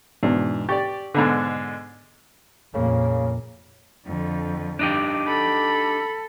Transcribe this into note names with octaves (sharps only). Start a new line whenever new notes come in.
E2 G#2 B2 D4
G4 D5 C#6 A6
G#2 B2 D3
F2 A#2 C#3 A#3
F2 D3
D4 D#4 G4
A4 B5